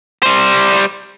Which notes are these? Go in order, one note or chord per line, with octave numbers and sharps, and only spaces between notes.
G3 C5